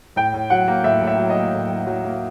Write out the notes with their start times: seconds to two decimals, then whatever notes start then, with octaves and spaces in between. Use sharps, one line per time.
0.16 A2 G5
0.34 A2
0.50 F#3 F#5
0.68 A#3
0.84 A2 E5
1.02 A2
1.07 E5
1.18 F#3
1.30 D#5
1.37 A#3
1.53 A2
1.70 A2
1.87 F#3
2.05 A#3